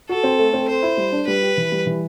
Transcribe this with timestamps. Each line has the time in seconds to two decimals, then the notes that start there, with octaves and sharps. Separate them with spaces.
0.09 F#4 A4
0.24 C4
0.39 A3
0.53 C4
0.68 A4 C5
0.82 E4
0.97 G3
1.12 D4
1.27 G3 B4
1.43 G4
1.57 E3
1.72 G3
1.87 E3